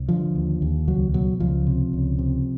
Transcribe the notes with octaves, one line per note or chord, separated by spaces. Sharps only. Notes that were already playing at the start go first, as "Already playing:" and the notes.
Already playing: C2
D3 F3
D#2
D#2
C#2 F#3
B2 F#3
C#2 F3
C3
C#2
C3